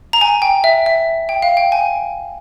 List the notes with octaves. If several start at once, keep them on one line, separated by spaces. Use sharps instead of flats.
A#5
G#5
G5
E5
E5
G5
F5
G5
G#5